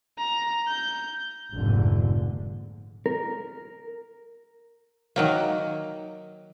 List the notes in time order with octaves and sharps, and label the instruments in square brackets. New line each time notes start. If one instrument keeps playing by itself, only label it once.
[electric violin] A#5
G6
[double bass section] F1 A#1 G#2 D3
[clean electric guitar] A#4
[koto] D#3 F#3 A#3